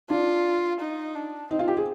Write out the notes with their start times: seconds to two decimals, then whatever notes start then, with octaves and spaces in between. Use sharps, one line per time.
0.09 D4 F4
0.80 D#4
1.15 D4
1.51 C4 D#4
1.59 F4
1.68 G4
1.77 G#4